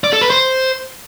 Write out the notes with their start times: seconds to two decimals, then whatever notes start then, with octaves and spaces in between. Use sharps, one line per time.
0.04 D5
0.13 A4
0.21 B4
0.30 C5